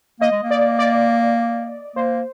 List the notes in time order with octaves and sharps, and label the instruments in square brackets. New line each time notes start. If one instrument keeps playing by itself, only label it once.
[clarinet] A#3 [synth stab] D#5
[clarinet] G#3
A#3
[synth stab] D5
D5
[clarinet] A#3 [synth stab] C5